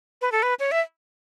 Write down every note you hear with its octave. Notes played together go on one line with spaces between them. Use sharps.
B4
A4
B4
C#5
E5